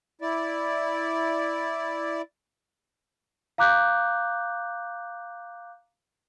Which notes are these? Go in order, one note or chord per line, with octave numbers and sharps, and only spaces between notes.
E4 D5
F5 A#5 D6 F#6 G6